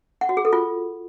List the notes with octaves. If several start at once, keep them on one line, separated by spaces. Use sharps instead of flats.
F#5
F#4
G#4
A4
F4